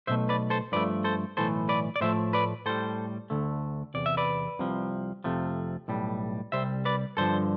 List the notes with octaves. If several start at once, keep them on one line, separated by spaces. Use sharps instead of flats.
B1 B2 A3 C5 E5
B4 D5
A4 C5
G2 F3 A3 B4 D5
A4 C5
B1 A2 E3 A3 A4 C5
B4 D5
D5
A2 F3 A3 C5 E5
B4 D5
A2 G3 A4 C5
D2 D3 A3
E2 C3 D5
E5
B4 D5
C2 C3 F3
F2 C3 F3 A3
B1 A2 G3
C2 C3 G3 C5 E5
B4 D5
G2 D3 F3 A4 C5